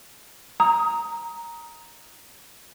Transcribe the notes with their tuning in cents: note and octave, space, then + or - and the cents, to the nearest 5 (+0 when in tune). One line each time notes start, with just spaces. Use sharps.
A#5 +0 D#6 +20